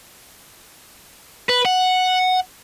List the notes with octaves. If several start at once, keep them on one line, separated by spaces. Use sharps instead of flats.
B4
F#5